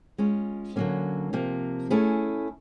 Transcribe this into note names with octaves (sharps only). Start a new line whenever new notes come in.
G#3 C#4 F4
D3 F#3 A#3 C#4
C3 F3 A#3
A3 C#4 E4 G#4